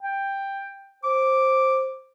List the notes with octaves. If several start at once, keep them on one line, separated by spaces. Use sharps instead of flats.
G5
C5 D6